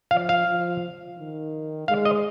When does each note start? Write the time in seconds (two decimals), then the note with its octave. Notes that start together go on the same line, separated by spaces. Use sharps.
0.11 F3 F5
0.29 F5
0.47 F3
1.17 D#3
1.88 G#3 F5
2.05 D#5